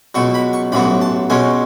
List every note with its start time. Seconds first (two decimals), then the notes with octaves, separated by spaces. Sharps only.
0.15 C#2 B2 F#3 C#6
0.34 B5
0.53 C#6
0.72 A1 G#2 F#3 B3 B5
1.01 A5
1.30 C#2 B2 G#3 C#4 G#5